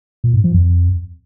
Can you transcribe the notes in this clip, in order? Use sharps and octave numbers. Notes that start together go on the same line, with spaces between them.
A#2
G#2
F3
F2